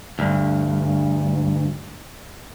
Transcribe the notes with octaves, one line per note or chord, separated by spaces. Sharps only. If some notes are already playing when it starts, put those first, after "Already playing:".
D2 G2